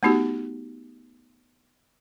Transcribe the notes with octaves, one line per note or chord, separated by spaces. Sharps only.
A3 B3 D#4 F#4 G4